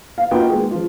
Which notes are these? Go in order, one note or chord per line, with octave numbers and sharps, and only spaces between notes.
F5
A#3 D#4 F4 F#4 B4 G5
G#3 A#3 G#4
F3 F4